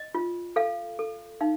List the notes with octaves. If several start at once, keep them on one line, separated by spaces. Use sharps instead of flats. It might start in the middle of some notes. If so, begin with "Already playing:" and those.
Already playing: D#5
F4
A4 F5
A4
D#4 F5